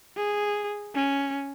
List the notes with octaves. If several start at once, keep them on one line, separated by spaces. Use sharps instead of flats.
G#4
C#4